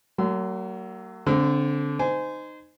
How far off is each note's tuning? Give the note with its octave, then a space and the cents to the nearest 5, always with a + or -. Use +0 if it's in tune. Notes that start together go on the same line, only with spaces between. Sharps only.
F#3 +30 A#3 -35 C6 -35
D3 -20 C4 +0 C6 -45
D#4 -20 C5 -25 G#5 +0